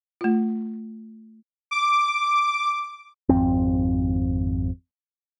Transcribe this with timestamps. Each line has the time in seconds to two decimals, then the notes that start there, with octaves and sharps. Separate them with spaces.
0.21 A3 F4
1.71 D6
3.29 G#1 F2 C4